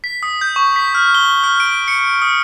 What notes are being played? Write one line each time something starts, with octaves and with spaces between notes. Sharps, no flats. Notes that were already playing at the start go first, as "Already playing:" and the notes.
B6
D#6
G6
C#6
B6
F6
G7
F6
D7
C#7
D#6